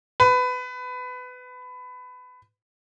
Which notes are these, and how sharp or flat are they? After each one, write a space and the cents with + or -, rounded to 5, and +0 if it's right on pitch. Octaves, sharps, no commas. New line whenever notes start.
B4 +20